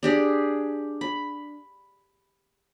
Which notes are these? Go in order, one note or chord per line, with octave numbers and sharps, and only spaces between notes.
D4 G4 G#4
B5